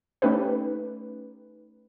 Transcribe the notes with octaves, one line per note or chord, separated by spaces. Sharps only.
A3 C#4 D#4 G4 B4